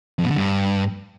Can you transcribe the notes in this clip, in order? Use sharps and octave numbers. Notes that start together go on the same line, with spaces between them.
F2
B2
D3
G2